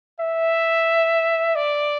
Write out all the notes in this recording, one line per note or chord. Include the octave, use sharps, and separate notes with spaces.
E5
D5